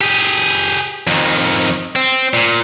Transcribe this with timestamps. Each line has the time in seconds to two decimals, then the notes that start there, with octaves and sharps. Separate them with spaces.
0.01 G4 G#4
1.07 F2 D#3
1.96 C4
2.33 A#2